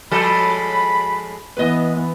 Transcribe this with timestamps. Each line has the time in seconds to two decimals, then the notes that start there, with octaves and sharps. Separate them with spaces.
0.12 F3 G#3 A4 B5
1.57 E3 B3 B4 D#5